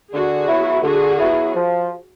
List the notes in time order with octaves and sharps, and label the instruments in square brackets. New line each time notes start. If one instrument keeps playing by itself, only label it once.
[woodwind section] D3 [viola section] F#4 G#4
[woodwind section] F#3 B3 E4
[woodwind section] D3 [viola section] F#4 G#4
[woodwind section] F#3 B3 E4
F3